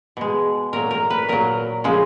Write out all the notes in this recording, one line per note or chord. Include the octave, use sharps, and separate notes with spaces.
B2 G#3
A#2 F#3 A#4
A#4
B4
A#2 F#3 A#4
C#3 F3 G#3